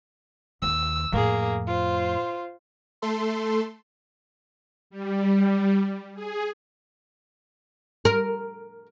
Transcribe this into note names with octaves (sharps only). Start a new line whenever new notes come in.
D#2 E6
F2 A2 A#3 G#4
F4 C5
A3 A4 C6
G3
G#4
A#4